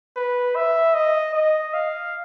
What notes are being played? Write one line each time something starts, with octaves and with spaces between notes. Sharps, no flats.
B4
E5
D#5
D#5
F5